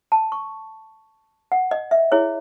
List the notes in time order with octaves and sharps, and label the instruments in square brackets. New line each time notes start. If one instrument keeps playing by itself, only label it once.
[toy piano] A5
C#6
F#5
D#5
E5
E4 G#4 C#5